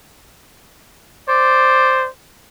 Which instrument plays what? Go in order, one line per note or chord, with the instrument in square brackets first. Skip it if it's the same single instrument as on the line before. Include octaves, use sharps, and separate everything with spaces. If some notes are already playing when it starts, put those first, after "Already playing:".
[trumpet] C5 [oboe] D5